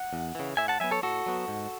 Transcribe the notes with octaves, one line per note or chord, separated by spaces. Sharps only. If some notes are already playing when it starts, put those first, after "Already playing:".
Already playing: F#5
E2
C#3 E3
A2 E5 G#5
F#5 A5
F#3 B3 E5 G#5
A4 C#5
A2 F#4 A4
F#3 B3
G#2